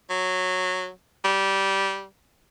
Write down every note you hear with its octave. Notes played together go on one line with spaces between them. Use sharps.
F#3
G3